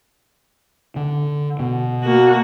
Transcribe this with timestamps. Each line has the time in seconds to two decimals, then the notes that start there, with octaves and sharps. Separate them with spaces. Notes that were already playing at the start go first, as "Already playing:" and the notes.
0.96 D3
1.60 B2
2.04 A#3 F#4